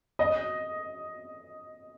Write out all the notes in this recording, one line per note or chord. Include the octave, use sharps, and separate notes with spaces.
D#5